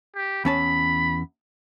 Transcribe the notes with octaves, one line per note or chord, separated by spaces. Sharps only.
G4
E2 C#4 A5 B5